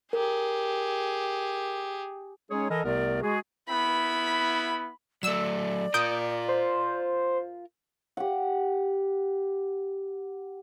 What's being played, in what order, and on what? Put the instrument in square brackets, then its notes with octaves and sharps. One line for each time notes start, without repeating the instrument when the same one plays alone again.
[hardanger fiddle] G4 G#4 [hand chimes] A#4
[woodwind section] G#3 C#4 D#4 G#4 C#5
E3 A4 A#4 D#5
C2 C3 A3 B3 A#4 D5
G#3 F#4 G#4
[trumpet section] B3 E4 [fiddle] B5
[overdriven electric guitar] F#3 A3 [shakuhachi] D5 [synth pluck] E6 E7
[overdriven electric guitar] F4 A#4 [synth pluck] D#6 G6 D7
[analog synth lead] C5
[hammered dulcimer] G4 F#5